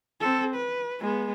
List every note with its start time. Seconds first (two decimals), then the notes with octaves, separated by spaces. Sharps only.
0.20 C4 A4
0.55 B4
1.01 G#3 B3